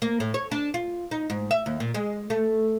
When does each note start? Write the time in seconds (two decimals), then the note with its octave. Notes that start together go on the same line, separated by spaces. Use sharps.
0.02 A#3
0.20 A2
0.34 C#5
0.51 D4
0.74 F4
1.11 D#4
1.30 G#2
1.51 E5
1.66 D#2
1.80 A#2
1.94 G#3
2.30 A3